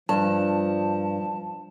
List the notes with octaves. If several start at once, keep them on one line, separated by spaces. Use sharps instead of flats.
G2 F3 A5